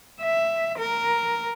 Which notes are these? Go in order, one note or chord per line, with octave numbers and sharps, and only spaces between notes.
E5
A#4